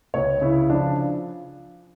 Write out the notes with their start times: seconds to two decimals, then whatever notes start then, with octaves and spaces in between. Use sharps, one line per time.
0.14 C#2 C#5
0.41 C#3 E4
0.70 F3 D4